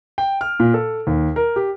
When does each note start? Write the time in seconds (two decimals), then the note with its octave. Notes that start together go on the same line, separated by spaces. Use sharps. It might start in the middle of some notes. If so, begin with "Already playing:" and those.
0.18 G5
0.41 F6
0.60 A#2
0.74 A4
1.07 D#2
1.36 A#4
1.56 G4